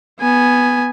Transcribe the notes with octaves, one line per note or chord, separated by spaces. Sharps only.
B3 G#5